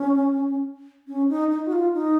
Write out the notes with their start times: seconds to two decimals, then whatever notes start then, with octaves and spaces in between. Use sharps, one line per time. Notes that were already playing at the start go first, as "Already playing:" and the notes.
Already playing: C#4
1.08 C#4
1.29 D#4
1.51 D#4
1.67 F#4
1.72 F4
1.94 D#4